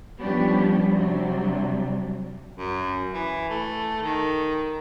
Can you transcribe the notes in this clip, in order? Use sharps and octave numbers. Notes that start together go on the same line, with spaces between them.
F3 G3 B3 C#4 D4 G4
C3 F#3 G3 D4
F#2
E3
A3
D#3